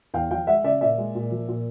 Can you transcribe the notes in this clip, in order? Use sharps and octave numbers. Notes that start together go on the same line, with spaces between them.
E2 F5 G5
F3 F5 G5
G#3 E5 F#5
C#3 D5 E5
A#2 D5 E5
G#3
A#2
F3
A#2